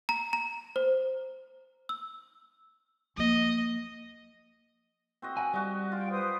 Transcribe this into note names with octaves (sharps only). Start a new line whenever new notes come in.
A#5
A#5
C5
E6
F3 A#3 D#5
C4 F#4 D#5
F#5 G#5
G3 F#4 D#5
F4 G5
B4 C5 D#6